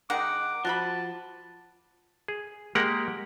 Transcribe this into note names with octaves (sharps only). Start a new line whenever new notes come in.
D#3 G#3 D#4 F#5 D6
F3 F#4 F5 A5 B5
G#4
G#3 A#3 G4 A#4 F#5